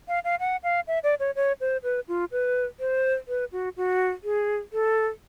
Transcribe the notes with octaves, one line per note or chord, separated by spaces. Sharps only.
F5
F5
F#5
F5
E5
D5
C#5
C#5
C5
B4
F4
B4
C5
B4
F#4
F#4
G#4
A4